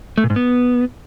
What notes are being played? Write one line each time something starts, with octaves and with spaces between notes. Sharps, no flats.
A3
A#2
G#2
B3